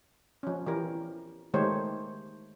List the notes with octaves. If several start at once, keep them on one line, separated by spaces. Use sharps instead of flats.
F3 C#4
E3 G4 A#4
D#3 G#3 A3 G4 C5 C#5